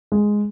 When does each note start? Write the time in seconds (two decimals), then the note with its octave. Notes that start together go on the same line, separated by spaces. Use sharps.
0.12 G#3